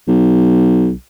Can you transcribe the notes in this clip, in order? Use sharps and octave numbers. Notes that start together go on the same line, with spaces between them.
B1